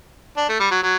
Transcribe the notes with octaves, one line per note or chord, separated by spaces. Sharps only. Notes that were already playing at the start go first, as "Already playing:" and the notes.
D4
A3
G3
F#3
F#3